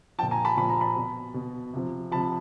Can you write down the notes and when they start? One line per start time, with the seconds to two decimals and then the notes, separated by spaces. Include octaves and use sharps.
0.18 F3 G5 A5
0.23 A#2
0.31 G#5 A#5
0.45 A5 B5
0.57 A#2 F3 B5
0.70 A#5
0.81 A5 B5
0.96 B2
1.34 B2
1.73 C3 F3
2.12 C3 F3 A5 B5